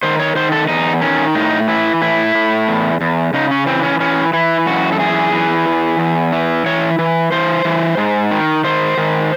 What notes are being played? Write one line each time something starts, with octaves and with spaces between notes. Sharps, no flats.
D#3 C5
C#5
D#3 C5
A4
E2 D#4
D#3 C#4
A2 D#4
E3 E4
A2 E4
A2
E2
E2
C#3 D#4
C#4
E3 C4
C#4
E3 C#4
E3 E4
F#2 F#4
A4
E3 G#4
E3
E2
E2
E3
E3 C#5
E3
E3 C5
E3
G#2
D#3
D#3 C5
D#3